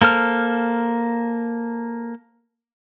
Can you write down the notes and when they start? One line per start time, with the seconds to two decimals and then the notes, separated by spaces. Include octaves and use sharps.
0.02 A#3 A4 C5 F6